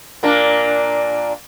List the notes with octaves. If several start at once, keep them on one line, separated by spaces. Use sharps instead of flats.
A#2 A#3 D4